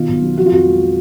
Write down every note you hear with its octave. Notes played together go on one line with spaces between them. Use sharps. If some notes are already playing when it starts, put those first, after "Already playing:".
Already playing: B2 D#3 F4
B1
F#3
F3 F#4
F4
F2 F#4
G#3